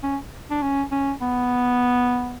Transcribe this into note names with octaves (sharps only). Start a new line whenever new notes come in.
C#4
D4
C#4
C#4
B3